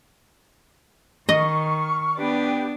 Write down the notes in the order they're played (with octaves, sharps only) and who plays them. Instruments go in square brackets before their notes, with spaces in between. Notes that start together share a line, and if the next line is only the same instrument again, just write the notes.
[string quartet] D#3 [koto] D#5 [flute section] C#6 F6
[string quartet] B3 D4 [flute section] G4 B4 G5